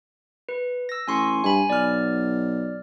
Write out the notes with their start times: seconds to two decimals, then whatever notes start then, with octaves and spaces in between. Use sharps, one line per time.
0.49 B4
0.89 E6 A#6
1.08 A1 G#5 C6 C#6
1.44 G2 G#5 B5
1.70 B1 D5 F6